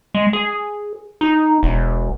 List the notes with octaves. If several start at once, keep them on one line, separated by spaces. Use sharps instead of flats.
G#3
G#4
D#4
E1